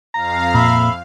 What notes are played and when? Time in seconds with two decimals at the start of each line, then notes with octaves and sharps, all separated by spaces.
0.14 F2 F5 A#5
0.54 A#2 E5 B5